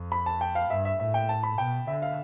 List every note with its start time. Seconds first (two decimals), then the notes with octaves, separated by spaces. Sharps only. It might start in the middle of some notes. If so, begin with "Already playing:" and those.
Already playing: F2
0.12 B5
0.26 A5
0.41 G5
0.55 F5
0.70 G2 E5
0.85 E5
0.99 A2 E5
1.14 G5
1.29 A5
1.43 B5
1.58 B2 G5
1.87 D3 E5
2.02 F5